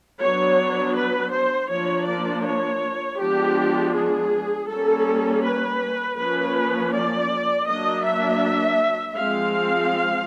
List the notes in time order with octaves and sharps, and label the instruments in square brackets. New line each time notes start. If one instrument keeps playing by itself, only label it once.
[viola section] F#3 B3 D4 C#5
B4
C5
F3 A#3 D4 C#5
D5
C#5
F3 G#3 B3 D4 G4
G#4
G3 A#3 C#4 A4
B4
F3 A#3 C#4 B4
D5
F#3 A#3 D4 D#5
E5
F3 G#3 C4 F5